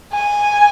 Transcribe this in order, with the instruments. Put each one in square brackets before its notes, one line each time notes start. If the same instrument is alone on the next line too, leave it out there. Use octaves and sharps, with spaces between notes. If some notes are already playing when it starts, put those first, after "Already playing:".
[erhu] G#5